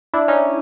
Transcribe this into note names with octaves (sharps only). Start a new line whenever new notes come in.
D4 E4
C#4 D#4